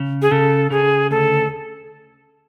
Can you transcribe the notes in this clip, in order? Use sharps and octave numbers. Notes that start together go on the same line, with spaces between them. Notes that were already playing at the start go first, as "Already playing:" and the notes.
Already playing: C#3
G#4
C#3 A4
C#3 G#4
D2 A4